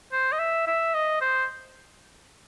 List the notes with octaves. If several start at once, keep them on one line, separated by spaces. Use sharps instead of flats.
C5
D#5
E5
E5
D#5
C5